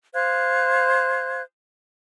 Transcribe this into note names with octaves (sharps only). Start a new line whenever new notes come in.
C5 F5 F#6 G#6